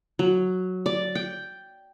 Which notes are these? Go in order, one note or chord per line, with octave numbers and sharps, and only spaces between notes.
F#3
D5
G5